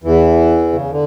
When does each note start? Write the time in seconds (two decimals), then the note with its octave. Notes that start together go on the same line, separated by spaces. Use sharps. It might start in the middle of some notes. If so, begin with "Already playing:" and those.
0.04 E2 E3
0.73 C#3
0.91 D3